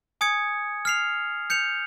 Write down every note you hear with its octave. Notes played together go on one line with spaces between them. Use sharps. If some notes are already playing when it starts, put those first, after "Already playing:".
G#5 D#6 G#6 C#7
F6 C7 F7
G6 C#7 F7